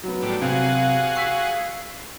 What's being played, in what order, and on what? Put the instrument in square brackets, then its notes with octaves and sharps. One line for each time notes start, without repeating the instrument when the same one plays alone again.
[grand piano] F#3 B3
[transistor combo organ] A2 G3 D4
[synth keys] C3 [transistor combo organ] F#4 G#4 [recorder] F5
[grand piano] C#6 E6 B6 [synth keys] C7